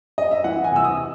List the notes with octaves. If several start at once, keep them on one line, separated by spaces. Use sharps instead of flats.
D#5
E5
E3 F#5
G#5
C3 E6
D#6